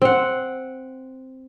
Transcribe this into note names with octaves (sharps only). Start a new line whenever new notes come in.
C4 F#5